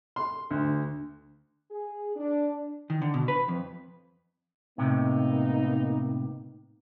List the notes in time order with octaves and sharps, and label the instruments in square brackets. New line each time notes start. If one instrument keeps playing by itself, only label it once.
[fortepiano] C6
D2
[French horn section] G#4
D4
[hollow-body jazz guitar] D#3
D3
B2
B4
F2
[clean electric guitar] A2 C3 [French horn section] A#3 B3 D#4